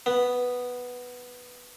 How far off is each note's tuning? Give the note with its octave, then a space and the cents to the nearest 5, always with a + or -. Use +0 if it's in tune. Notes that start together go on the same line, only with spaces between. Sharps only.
B3 +0